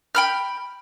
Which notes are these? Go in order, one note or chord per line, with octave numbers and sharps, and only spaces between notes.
G5 B5 F6